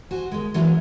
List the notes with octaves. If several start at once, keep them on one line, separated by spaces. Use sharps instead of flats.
F#4 C5 G#5
D#2 G#3
E3 F#3 G#3 A#3 C#4 D4